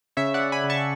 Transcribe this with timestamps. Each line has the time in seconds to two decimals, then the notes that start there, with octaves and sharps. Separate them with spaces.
0.17 C#3 C#5 E5
0.34 D5 F#5
0.40 C#3
0.52 G#5 B5
0.64 C#3
0.70 A5 C#6